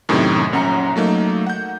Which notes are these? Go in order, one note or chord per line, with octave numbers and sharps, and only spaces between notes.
F#2 A2 C3 D#3
A#1 F#2 C#4 F#5 A#5 C#7
F#3 A3 A#3 D#4
F#5 G6